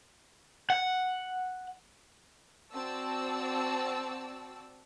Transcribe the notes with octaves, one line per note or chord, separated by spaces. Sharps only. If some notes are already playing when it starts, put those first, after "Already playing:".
F#5
C4 F#4 D5 A5 E6